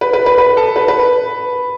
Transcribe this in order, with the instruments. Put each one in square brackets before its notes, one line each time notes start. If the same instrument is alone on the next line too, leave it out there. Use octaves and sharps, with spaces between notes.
[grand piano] B4
B4
B4
B4
A4
B4
B4